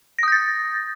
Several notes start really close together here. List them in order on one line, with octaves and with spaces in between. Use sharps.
A#6 D#6 G6 A6